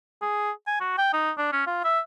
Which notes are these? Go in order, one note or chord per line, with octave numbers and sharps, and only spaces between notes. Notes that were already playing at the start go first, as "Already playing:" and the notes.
G#4
G#5
F#4
G5
D#4
D4
C#4
F4
E5